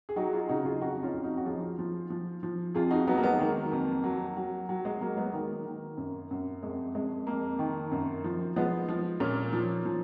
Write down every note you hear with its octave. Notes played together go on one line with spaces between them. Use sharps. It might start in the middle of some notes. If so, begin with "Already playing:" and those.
G#4
F#3 D#4 F#4
F4 G#4
C#3 D#4 F#4
F4 G#4
F2 D#4 F#4
C#4 F4
F2
D#4 F#4
F#4
F3 F4 G#4
F3
F3
F3
F2 F4 G#4
D#4 F#4
F#3 B3 D#4
A#3
G#3 B3
D#3 A#3
F2
F#3
F#3
F#3
G#3
F#3 A#3
G#3 B3
D#3 A#3
D#3
F#2
F#2
F2 G#3
F2 G#3
F2 A#3
D#3
F#2
F3
F3 G#3 B3
F3
A#2 A#3 C#4
F3
F3